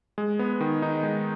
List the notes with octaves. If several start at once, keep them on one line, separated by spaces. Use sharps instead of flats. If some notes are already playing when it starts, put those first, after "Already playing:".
G#3
B3
D#3
D#4
G#3